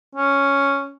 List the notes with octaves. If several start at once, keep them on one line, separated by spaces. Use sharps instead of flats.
C#4